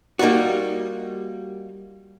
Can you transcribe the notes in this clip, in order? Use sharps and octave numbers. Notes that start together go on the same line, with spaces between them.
G3 A#3 D#4 F4 F#4